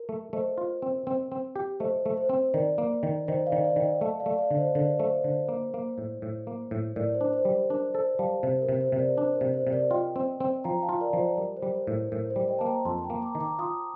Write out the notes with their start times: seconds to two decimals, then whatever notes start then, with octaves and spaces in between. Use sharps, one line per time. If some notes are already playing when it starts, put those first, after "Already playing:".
Already playing: A#4
0.09 A3
0.33 A3 C5 D#5
0.58 F4
0.82 C4
1.07 C4
1.32 C4
1.56 G4
1.80 A3 C5 D#5
2.06 A3
2.17 C5
2.29 C4
2.54 D#3 A#4 D5
2.78 A#3
3.03 D#3
3.28 D#3 C5 D#5
3.46 D5 F5
3.52 D#3
3.65 D5 F5
3.76 D#3
3.82 D#5 G5
4.01 A3 F5 A5
4.20 D5 F5
4.26 A3
4.38 D5 F5
4.51 D3
4.57 C5 D#5
4.75 D3 A#4 D5
5.00 A3 C5
5.24 D3 C5
5.49 A#3
5.74 A#3
5.98 A2
6.22 A2
6.47 A#3
6.71 A2
6.96 A2 A#4 D5
7.15 C5
7.21 D4
7.33 C5
7.45 G3
7.52 C5
7.70 D4 A#4
7.94 A4 C5
8.19 G3 F5 A5
8.43 C3 C5
8.62 A#4
8.69 C3
8.81 C5
8.92 C3
8.99 A#4 D5
9.17 D4 C5
9.35 A#4
9.41 C3
9.54 C5
9.67 C3
9.72 A#4 D5
9.91 F4 D#5 G5
10.16 C4
10.40 C4
10.64 F3 G5 A#5
10.83 F5 A5
10.89 F4
11.01 A#4 D5
11.13 F3
11.19 C5
11.38 G3 A#4
11.57 C5
11.63 G3
11.76 C5
11.87 A2
11.93 A#4
12.12 A2 A#4
12.30 C5
12.36 G3
12.48 D#5 G5
12.59 A#3 A5
12.67 G5 A#5
12.85 F2 A5 C6
12.98 C6
13.04 G5 A#5
13.10 A#3
13.22 A#5 D6
13.35 D#3
13.40 A#5 D6
13.59 F4 C6 D#6